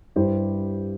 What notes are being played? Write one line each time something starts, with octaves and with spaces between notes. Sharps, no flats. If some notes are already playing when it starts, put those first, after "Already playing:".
G2 G3 E4 G4 C5